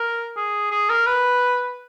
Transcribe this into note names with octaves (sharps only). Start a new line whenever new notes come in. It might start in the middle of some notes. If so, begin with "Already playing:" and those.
Already playing: A#4
G#4
G#4
A#4
B4